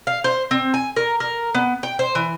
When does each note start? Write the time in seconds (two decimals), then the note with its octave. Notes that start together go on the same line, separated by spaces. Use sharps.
0.07 F5
0.24 C5
0.51 C4
0.74 G#5
0.96 A#4
1.20 A#4
1.54 B3
1.83 G5
1.99 C5
2.15 E3